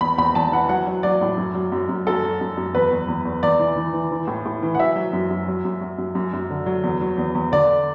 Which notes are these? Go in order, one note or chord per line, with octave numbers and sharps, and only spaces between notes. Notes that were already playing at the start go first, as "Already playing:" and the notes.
E2 B5
E2 B5
E2 A5
E3 F#5
F#3 F#5
F#3
F#3 D5
A2
F#2
F#3
F#2
F#2
F#2 A4
F#3
F#2
F#2
E2 B4
E2
E2
E2
E2 D5
E3
E3
E3
E3
A2
A2
E3
F#5
F#3 E5
F#3
F#2
F#2
F#3
F#2
F#3
F#2
F#2
F#2
D3
F#3
E2
F#3
E2
E2
D3 D5